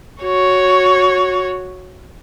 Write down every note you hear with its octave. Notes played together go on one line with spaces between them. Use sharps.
F#4 C#5